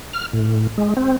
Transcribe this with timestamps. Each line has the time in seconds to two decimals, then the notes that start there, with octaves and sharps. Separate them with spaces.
0.13 F6
0.33 A2
0.78 G#3
0.97 C4